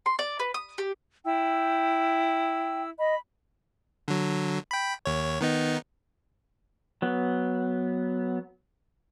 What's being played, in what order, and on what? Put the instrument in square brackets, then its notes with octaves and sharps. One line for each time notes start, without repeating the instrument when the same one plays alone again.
[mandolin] C6
D5
B4
D#6
G4
[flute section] E4 E6 [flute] G5
[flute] D#5 [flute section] B5
[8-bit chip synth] D3 F#3
G5 B5
D#2 C#5
D#3 B3 D#4
[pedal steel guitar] F#3 B3